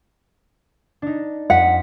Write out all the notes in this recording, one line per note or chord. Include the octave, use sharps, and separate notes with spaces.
D4 D#4
F2 F#5 B6 D#7